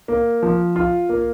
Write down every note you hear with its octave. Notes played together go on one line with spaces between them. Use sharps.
A#3
F3
F4
A#3